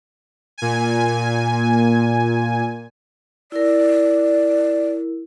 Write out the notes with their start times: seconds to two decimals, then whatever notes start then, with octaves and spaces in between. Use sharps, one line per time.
0.58 A#2 G#5
3.52 E4 A#4 D5